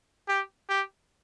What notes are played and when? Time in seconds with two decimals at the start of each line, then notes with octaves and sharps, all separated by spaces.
0.28 G4
0.69 G4